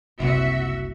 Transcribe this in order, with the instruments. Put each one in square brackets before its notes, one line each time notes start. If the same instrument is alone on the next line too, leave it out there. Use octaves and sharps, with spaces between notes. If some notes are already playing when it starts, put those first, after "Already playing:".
[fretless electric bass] F#1 C2 C3 [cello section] F#4 E5